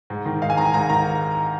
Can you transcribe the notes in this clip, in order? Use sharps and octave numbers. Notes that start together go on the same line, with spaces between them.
G#2
D#3
G#2 F5
G#5
D#3 A#5
G#5
G#2 A#5
D#3 A#5